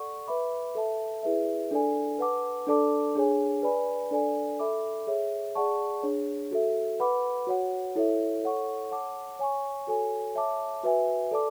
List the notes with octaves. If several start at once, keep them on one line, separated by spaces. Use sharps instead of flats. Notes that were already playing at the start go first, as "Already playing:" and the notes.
Already playing: A4 D5 F#5 C#6
B4 E5 B5 D6
A4 E5 A5
E4 G#4 B4 E5
D4 A4 D5 G#5
B4 F#5 A5 D6
D4 A4 D5 A5 D6
D4 G#4 C#5 G#5
B4 D5 G#5 B5
D4 A4 D5 G#5
A4 E5 B5 D6
G#4 C#5 E5
G#4 D5 F#5 A5 C#6
D4 G#4 C#5
F#4 A4 E5
B4 F#5 B5 D6
F#4 C#5 F#5
E4 A4 C#5 E5
A4 C#5 F#5 C#6
C#5 F#5 A5 D6
C#5 G#5 C#6
F#4 A4 C#5 G#5
C#5 E5 A5 D6
F#4 B4 E5 G#5
A4 D5 A5 D6